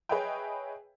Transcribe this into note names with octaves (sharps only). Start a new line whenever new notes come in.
G#4 B4 C#5 D#5 E5 G5